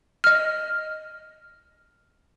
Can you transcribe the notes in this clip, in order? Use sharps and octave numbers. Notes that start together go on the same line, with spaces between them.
D#5 F6